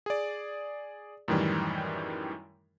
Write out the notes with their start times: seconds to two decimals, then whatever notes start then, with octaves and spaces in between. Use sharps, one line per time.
0.06 G#4 D5
1.28 F#2 A2 D#3 E3 G3